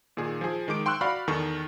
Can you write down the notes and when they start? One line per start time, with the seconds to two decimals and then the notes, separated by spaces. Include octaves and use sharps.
0.17 A#2 D#3 G#4
0.41 F3 G#4
0.68 D#3 G#3 D6 D7
0.86 G5 C6 C#6 E6 F#6
1.01 F#4 D5 F5 B5 C#6 F6
1.27 E2 D#3 A4 C#6